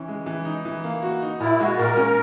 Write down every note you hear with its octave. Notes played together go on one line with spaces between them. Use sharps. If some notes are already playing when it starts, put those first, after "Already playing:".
Already playing: E3 C#4 E4
G#3
E3
D#4
E3
A#3
F#4
D#4
A#2 E4
G#3 F#4
A#2 A#4
C#4